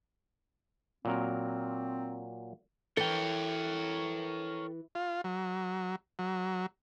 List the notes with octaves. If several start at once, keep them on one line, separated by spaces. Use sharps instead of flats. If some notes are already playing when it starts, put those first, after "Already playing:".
A#2 F#3 C4 A#4
E3 A4 A#4 C#5 G5
F4
F#3
F#3